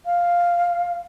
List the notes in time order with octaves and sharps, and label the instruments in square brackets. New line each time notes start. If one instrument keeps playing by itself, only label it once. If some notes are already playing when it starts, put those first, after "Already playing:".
[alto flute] F5